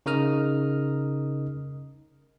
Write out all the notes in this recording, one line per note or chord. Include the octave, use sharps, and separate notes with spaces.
C#3 D#4 A#4 D#5 D#6 F6